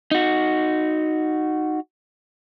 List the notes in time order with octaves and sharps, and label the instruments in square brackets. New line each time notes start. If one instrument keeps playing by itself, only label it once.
[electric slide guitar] D#4 F#4